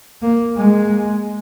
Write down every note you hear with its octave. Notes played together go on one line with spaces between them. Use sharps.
A#3
G#3